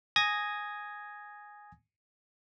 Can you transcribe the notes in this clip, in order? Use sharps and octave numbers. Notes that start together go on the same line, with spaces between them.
G#5 D#6 G#6 A#6